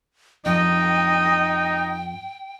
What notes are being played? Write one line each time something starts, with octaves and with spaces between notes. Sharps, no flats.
F2 D#4 D#5 G5